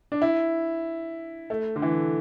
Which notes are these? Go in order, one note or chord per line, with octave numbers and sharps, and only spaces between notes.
D4
E4
A3
D3
E3